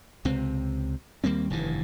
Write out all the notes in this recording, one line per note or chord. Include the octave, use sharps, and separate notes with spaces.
C#2 C3 C4
D#2 G3 A#3 C4
F1 G2 D#3 E3